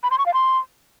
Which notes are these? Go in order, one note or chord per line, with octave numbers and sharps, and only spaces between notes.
B5
C6
C#6
F5
C6